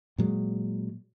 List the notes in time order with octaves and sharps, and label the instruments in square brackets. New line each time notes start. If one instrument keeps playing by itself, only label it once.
[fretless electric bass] A#2 F#3 G#3